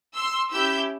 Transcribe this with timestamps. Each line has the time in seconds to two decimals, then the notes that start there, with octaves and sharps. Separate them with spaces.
0.15 C6 E6
0.52 C#4 E4 G4 E6 G6